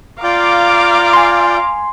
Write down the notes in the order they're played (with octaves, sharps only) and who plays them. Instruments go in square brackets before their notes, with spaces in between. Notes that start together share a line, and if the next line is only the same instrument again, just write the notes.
[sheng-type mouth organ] F4 D5 G5 [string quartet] F5 A#5 D6
[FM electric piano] G#5 C6